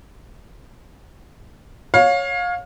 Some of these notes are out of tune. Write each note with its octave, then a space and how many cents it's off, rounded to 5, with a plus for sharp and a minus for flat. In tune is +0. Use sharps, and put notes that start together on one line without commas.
C#5 +0 F5 +25